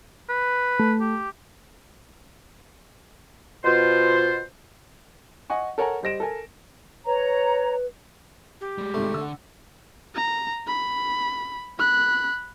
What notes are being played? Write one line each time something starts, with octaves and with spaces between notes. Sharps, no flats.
B4
A3
G4
B2 F4 C5
D#5 F#5 G#5 C#6
A4 A#4 C#5 F#5 G#5 A#5
G3 C5 D#5 A#6 D7 E7
A4 A#4 G#5
B4 C#5 A#5
G4
G3 G#3
G#1 G#2 C3 A3
D3 F#5 E6
A#5
B5
B5 F#6